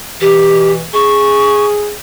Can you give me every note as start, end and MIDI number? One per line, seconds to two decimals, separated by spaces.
0.21 0.84 43
0.21 0.84 47
0.21 0.84 52
0.21 0.72 67
0.94 1.92 68
0.94 1.66 85